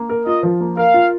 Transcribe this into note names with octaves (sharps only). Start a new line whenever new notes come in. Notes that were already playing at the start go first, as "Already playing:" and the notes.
Already playing: A#3
A#4
F4 D#5
F3
A#3
A#4 F5
F4